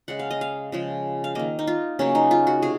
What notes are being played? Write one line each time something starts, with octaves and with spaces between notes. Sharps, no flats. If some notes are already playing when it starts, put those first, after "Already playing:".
C#3 G#3 F#5
F5
D#5
F5
C#3 F3 G#3
F5
D#3 A#3 D#5
D#4
F4
C#3 F#3 A#3 C#4
D#4
F4
F#4
C3 G#4